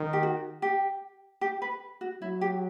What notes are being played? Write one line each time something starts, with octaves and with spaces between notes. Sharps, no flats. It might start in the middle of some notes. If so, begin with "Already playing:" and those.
Already playing: D#3
G4
F#4
G4
G4
B4
F#4
F#3 E4
G4